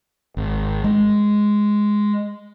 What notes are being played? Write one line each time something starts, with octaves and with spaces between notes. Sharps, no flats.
G#1
G#3